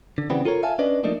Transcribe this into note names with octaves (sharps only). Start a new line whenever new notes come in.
D3
C#3 E3 G3 B3 C4
F4 A4 A#4 C#5
E5 F5 G#5 A5
C#4 D4 B4 D5 D#5
F3 A3 A#3 D4 D#4